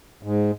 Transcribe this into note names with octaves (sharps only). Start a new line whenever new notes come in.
G#2